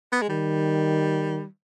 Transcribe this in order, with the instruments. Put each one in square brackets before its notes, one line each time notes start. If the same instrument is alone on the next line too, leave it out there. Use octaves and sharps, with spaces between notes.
[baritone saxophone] B3
G#3
[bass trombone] D#3 [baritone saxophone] G3